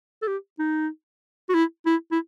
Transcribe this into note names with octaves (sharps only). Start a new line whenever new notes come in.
A4
G4
D#4
F#4
E4
E4
E4